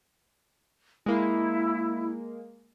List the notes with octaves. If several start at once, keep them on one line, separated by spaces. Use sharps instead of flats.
G#3 A#3 E4